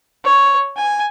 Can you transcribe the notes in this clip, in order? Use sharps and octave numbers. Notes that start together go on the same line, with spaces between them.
C#5
G#5